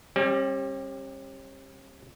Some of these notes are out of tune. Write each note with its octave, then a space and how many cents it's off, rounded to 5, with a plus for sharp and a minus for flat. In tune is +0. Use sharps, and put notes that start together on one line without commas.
G3 +15 C#4 -45 G4 +0